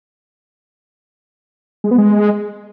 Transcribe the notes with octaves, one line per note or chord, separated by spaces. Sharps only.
G#3
B3
G#3